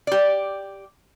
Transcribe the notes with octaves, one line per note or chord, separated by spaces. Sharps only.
G4 D5